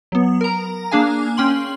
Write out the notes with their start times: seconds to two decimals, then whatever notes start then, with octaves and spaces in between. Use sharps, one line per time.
0.12 F#3 B3
0.41 A#4 A#5
0.91 A#3 D4 G#4 F5 G#5
1.37 C#4 G5 C6 F#7